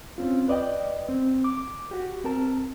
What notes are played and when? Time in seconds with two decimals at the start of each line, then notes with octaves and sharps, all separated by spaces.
0.18 C4 C#4 F4
0.48 B4 D5 D#5 G5
1.09 C4
1.44 D6
1.91 F#4 G4
2.24 C4 A#4 A5